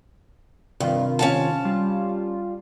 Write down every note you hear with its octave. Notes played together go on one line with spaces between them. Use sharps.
G2 C3 D#3 F4
C#4 F5 A5
G3 F4